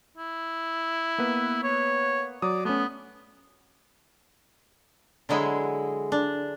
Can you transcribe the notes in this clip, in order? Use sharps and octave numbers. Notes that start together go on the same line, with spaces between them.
E4
A#3 B3 B4
C#5
F#3 D5 D#6
A3 B3 C#4
D3 F#3 G#3 E4 G#4
D4